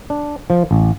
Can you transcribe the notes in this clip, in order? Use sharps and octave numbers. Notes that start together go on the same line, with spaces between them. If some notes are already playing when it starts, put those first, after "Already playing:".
D4
F3
A1